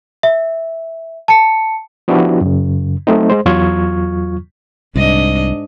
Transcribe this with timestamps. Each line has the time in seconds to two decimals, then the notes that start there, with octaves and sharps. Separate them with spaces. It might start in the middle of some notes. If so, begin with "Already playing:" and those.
0.23 E5
1.28 A5 C#7
2.08 F3 B3 D4 E4 F#4 G4
2.41 F#2 C#3
3.07 F#3 A3 C4 D#4
3.30 G#3 C5
3.46 E2 F#3 F4 C#6 F6 G#6
4.96 C2 G#2 D4 D#5